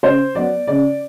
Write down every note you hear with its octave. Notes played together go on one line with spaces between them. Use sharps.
C#3 C5
F#3 B3 D5
C#3 D5